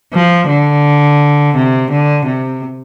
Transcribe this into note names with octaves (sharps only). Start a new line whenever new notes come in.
F3
D3
C3
D3
C3